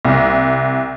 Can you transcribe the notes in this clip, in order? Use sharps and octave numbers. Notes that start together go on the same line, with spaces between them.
C2